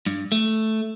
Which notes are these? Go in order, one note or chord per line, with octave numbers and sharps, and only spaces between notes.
G2
A3